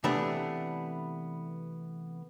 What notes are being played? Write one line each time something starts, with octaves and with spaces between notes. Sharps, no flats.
C3 E3 A3 B3 D4